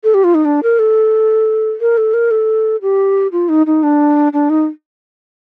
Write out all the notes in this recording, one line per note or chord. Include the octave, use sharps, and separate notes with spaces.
A4
G4
F4
D#4
D4
A#4
A4
A#4
A4
A#4
A4
G4
F4
D#4
D#4
D4
D4
D#4